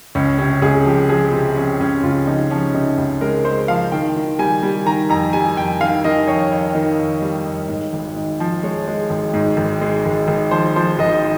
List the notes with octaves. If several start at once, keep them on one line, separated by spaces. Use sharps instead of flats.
C#2 C#4
C3 C#4
C#2 G#4
F3 G4
F3 G#4
C3 C4
F3 C#4
C#2 C#4
C#2 F4
F3 D#4
F3 C#4
C3 D#4
C#2
G#3 A#4
G#3 C5
F3 F5
D#3 G5
D#3
G3 G#5
G3
D#3 A#5
F2 A#5
G3 G#5
F2 G5
D#3 F5
D#3 D#5
F2 C#5
F2
D#3
F2
G3
F2
G#2
G#1
G#2
F3
G#3 C#5
G#3
G#1
G#2
G#1
G#3
G#1
G#1
F3 C5
F3 C5
G#1 D#5